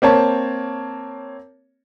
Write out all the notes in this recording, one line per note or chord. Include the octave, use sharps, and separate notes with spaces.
A#3 C4 C#5 A5